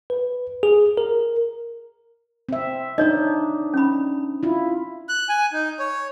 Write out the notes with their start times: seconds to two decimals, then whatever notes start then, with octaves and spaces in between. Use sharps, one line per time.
0.10 B4
0.63 G#4
0.97 A#4
2.49 C4 E5
2.98 D4 D#4 C#5 D#5
3.74 C#4 B5
4.43 E4 F4
5.09 F#6
5.29 G#5
5.53 D#4
5.79 C#5